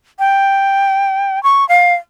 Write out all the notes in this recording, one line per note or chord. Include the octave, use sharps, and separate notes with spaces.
G5
C#6
F5